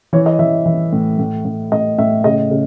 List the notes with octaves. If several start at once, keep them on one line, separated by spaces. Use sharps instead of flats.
E3 C#5
D#5
E3 E5
E3
A2
A2
A2
A2 D#5
A2 E5
C#3 D#5
C#3